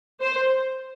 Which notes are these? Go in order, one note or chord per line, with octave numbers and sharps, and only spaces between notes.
C5